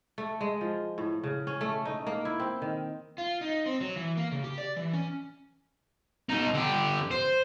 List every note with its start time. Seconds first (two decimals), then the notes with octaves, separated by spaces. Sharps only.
0.18 A3
0.41 G#3
0.61 F3
0.98 A2
1.23 C#3
1.47 C#4
1.61 A3
1.85 D#4
2.06 A#3
2.25 E4
2.40 C4
2.62 D#3
3.18 F4
3.41 D#4
3.66 C4
3.81 F#3
3.96 E3
4.17 A#3
4.32 C#3
4.44 G4
4.58 D5
4.77 E3
4.93 C#4
6.29 B2 D#4
6.54 D3 G4
7.11 C5